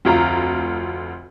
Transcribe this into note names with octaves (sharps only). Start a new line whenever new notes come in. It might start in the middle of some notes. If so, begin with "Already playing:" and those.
F1 D2 F4 A#5